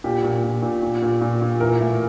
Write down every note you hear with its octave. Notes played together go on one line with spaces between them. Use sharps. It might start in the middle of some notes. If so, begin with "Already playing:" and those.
A#2 G4
A#2
A#2
A#2
A#2
A#2
A#2
A#2
E3 A#4
A2